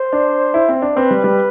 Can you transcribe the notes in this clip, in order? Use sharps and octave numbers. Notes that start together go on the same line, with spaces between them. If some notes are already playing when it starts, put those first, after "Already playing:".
Already playing: C5
D4
E4
C4
D4
C4 B4
G3
G3